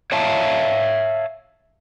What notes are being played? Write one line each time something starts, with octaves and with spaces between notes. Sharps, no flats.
C#5 E5 F5 A5 A#5